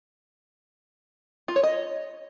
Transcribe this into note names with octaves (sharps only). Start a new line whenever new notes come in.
F4
C#5
D#5